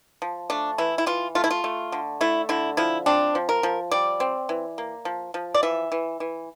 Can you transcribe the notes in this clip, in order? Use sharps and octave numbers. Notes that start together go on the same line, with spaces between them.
F3
A3 D4
E3 E4
E4
E3 F4
A3 F4
E4
F4
A3
D3
A3 E4
D3 E4
F3 E4
C4 D4
F3
A#4
F3
G3 D5
C4
E3
A#3
F3
F3
D5
E3 E5
E3
E3